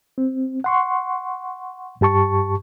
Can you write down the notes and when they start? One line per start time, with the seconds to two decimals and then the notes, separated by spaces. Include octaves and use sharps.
0.18 C4
0.64 F#5 C6 C#6
2.01 G2 G4 A5 C#6